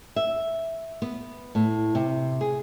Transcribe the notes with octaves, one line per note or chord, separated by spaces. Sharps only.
E5
B3
A2
C3
G#4